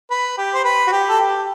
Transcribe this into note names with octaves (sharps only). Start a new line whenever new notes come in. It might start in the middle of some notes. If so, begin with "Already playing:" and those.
B4
G4
C5
B4
F#4
G4
A4
G4